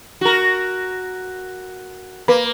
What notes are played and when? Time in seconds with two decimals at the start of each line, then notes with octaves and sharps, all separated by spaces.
0.21 F#4 A#4
2.28 A#3 B4